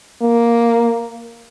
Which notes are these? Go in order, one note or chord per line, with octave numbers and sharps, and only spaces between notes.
A#3